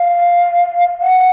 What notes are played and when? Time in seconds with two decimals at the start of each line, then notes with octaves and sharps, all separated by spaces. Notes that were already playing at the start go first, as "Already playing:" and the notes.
Already playing: F5
1.02 F#5